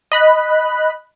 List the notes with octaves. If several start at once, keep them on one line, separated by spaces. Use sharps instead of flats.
D#5 B5 F#6